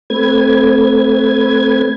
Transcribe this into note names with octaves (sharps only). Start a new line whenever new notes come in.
A3 C4 B4 G#6